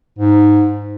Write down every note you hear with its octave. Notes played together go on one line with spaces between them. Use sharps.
G#2